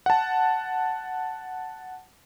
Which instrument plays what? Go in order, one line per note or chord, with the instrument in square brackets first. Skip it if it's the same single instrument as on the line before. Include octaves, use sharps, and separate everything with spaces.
[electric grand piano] F#5 A5